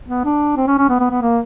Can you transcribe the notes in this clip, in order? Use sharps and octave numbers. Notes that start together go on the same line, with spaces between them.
B3
D4
C4
C#4
C#4
B3
B3
B3
A#3